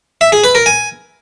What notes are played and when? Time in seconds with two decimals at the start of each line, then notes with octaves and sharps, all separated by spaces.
0.21 E5
0.32 G#4
0.44 B4
0.55 A#4
0.66 G#5